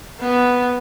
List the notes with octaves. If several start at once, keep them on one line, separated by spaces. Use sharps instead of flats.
B3